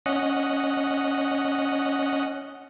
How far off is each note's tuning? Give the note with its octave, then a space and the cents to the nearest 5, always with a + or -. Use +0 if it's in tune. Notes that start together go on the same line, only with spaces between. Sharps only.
C#4 +0 D#5 +0 F#5 +0